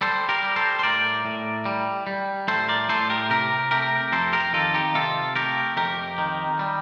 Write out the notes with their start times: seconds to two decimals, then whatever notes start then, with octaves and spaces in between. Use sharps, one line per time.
0.01 G3 A4 C5
0.29 G4 A#4
0.43 G3
0.56 A4 C5
0.79 C5
0.83 A2 A#4 D5
1.25 A2
1.65 G3
2.07 G3
2.48 A2 A4 C5
2.68 A#4 D5
2.89 A2 A4 C5
3.10 G4 A#4
3.30 C3 G4 A#4
3.71 A3 G4 A#4
4.12 F2 A4 C5
4.33 G4 A#4
4.53 D#3 F4 A4
4.74 D#4 G4
4.94 C3 F4 A4
5.36 A3 G4 A#4
5.77 F2 G4 A#4
6.18 D#3
6.59 G3